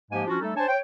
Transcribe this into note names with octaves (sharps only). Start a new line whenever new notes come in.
G#2 F3 G#3 A#3 G4 G#5
F3 C#4 D4 F4 F#4
G3 A3 D#4 A4
D4 C5 C#5 G#5 A5
C#5 G5